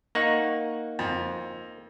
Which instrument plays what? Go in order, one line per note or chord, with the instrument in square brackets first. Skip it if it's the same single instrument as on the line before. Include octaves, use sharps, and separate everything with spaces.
[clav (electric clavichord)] A#3 D#4 F#5 [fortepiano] C#6
[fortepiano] F2